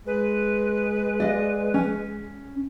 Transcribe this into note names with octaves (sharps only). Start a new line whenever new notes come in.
G#3 B4
D5 D#5 F5
C#4